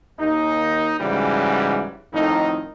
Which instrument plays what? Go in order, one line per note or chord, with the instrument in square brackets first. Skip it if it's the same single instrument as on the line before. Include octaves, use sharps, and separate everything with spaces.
[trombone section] D#2 D#4
G#2 C#3 E3 F#3 G3
F2 A2 D#3 D#4